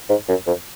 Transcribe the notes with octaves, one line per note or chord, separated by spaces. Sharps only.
G#2
F#2
F2